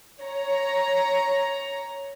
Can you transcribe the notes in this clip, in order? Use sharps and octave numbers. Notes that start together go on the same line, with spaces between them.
C#5 A#5